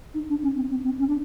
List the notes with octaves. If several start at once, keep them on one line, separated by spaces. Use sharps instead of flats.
D#4
D4
C#4
C4
C4
C4
C#4
D4